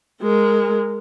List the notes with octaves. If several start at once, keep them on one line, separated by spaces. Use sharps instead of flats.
G#3 A#4